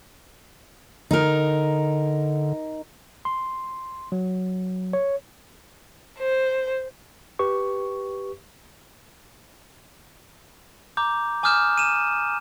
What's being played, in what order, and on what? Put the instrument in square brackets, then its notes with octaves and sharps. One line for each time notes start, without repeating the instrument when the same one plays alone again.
[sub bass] D3 [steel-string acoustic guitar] D#4 A#4
[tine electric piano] C6
F#3
C#5
[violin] C5
[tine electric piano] G4 B4 C#6
[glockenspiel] A#5 D6 G6
G#5 D6 D#6 F6 G6 E7
D#7 E7